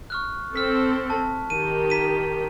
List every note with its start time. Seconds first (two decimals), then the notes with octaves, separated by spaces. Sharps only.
0.10 C#6 F6 F#6
0.56 C4 A4 F6 B6
1.10 A5
1.50 D#3 G4 D#7
1.90 A#5 B6 D#7